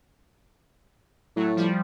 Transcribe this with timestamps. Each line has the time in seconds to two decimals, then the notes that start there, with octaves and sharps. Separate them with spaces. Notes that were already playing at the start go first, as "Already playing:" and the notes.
1.36 A2 F#3 A3
1.56 F3 G3